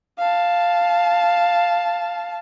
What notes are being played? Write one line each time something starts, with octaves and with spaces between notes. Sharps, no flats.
F5 A5